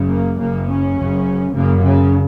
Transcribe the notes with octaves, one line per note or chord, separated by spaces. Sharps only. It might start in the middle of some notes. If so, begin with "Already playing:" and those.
Already playing: F#1 F#2 C#3
A#3
F#1 F#2 C#3 A#3
C#4
F#1 F#2 C#3
F#1 F#2 C#3 A#3
C#3